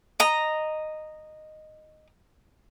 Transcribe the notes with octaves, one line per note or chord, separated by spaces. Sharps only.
D#5 A#5